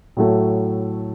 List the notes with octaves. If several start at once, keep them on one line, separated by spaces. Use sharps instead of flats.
A2 F#3 A3